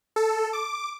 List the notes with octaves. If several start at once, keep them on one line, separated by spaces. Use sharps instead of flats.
A4
D6